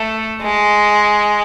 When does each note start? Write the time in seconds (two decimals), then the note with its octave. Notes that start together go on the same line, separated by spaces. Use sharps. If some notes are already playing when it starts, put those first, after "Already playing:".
Already playing: A3
0.43 G#3